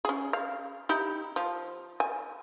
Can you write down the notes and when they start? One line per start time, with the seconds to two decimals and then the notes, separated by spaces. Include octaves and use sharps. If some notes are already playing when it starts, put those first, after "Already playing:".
0.05 C#4 G#4
0.33 F5
0.89 D#4 E4 G4
1.36 F3
2.00 G#5